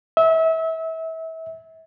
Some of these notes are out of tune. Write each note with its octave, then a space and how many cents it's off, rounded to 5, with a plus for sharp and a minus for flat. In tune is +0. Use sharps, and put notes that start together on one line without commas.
E5 -30